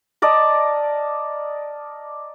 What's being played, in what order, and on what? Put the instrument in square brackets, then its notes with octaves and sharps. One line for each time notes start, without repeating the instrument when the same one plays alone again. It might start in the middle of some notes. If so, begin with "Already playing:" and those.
[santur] A#4 D5 D#5 A5